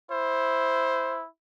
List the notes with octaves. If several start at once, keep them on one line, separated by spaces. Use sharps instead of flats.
E4 C5